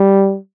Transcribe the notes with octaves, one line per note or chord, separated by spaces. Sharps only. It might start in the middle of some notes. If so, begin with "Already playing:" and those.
Already playing: G3